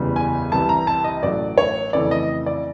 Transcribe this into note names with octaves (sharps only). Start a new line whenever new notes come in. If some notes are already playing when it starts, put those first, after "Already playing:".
Already playing: F#1 E2 C#3 E3 G3
G#5
C2 C3 E3 G3 A5
A#5
A5
D#5
A1 A2 F#3 D5
C#5
F2 C#3 E3 A3 D5
D#5
D5